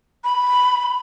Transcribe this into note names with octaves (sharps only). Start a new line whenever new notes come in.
B5